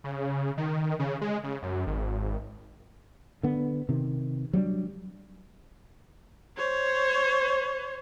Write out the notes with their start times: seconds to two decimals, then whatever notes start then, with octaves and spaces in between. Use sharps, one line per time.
0.04 C#3
0.57 D#3
0.99 C#3
1.21 G#3
1.44 C#3
1.62 F#2
1.87 G#1
3.43 D3 B3
3.89 C3 D#3
4.53 F#3 G3 C4 D4
6.57 C5 C#5